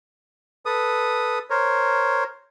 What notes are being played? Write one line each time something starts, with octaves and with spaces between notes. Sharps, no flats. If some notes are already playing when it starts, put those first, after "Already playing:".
A4 B4 D#6
A#4 C5 C#5